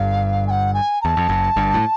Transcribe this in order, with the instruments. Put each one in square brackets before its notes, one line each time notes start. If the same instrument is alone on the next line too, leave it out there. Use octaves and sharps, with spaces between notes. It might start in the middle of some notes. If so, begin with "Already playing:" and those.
Already playing: [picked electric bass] G1 G2 [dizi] F5
[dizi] G#5
F#5
G#5
A#5
[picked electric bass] E2 [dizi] A5
[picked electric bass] F2
F#1 F#2
G1 G2
A2